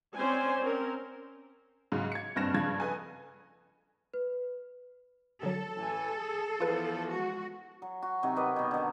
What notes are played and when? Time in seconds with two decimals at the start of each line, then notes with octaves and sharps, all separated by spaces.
0.16 C4 C#4 C5 D5 G#5
0.62 C4 C#4 A#4
1.92 G#2 C#3 F#3
2.12 G#6 C#7
2.36 F#1 G2 C4 F6 A#6 E7
2.54 G2 C#3 F3 F#6 G#6
2.80 A4 B4 D#5 G#5
4.14 B4
5.43 D3 F#3 A4
5.77 A1 E3 G#5
6.18 G#4
6.60 E2 F3 F4 B4
7.10 G#3 F#4
7.82 F#3
8.02 F#4
8.23 C3 D#3 F#3
8.36 A#4 B4 D5 D#5
8.56 B2 D#3
8.71 D3 D#3